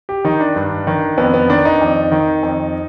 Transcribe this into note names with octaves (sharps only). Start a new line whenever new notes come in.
G4
D#3 D#4
D4
G2
D#3
F2 B3
B3
D#3 D4
D#4
F2
D#3
F2